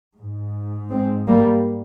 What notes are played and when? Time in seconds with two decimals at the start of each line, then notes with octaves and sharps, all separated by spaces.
0.16 G#2
0.90 G#3 C4
1.28 G3 A#3